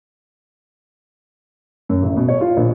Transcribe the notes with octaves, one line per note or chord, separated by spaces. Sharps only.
F#2
A1
B2
C#5
F4
A#1